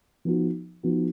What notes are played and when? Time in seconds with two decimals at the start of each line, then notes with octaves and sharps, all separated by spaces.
0.25 F3 B3 D#4 F#4
0.83 F3 B3 D#4 F#4